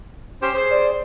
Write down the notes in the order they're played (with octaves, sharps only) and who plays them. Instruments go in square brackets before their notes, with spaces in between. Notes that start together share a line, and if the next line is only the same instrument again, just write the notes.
[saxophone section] C#4 G4 C5
G#4 C5
[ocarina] D5